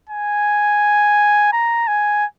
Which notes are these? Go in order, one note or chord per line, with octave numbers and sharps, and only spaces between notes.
G#5
A#5
G#5